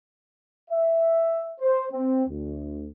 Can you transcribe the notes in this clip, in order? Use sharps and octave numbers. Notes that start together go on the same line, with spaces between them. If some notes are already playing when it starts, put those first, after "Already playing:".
E5
C5
C4
D2